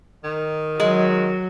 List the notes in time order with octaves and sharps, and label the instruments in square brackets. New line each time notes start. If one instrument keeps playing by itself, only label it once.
[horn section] D#3
[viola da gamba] F#3 [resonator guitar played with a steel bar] G#3